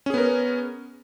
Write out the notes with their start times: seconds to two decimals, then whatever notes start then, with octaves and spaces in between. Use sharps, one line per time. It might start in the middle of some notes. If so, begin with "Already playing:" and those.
0.06 C#4
0.10 G#4
0.14 B3
0.18 A#4